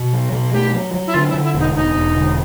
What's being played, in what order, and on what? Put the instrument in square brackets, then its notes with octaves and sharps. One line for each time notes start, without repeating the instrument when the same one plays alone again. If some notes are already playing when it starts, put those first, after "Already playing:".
Already playing: [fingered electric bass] B2
F#3
B2
[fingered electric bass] A3 [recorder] G4
[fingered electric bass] F#3
F#3
[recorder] E4
[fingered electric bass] D3 [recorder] F4
[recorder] E4
[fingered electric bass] D3
[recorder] E4
[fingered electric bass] E1
[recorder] D#4
[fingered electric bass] E1 [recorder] D#4
[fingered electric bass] E1
D3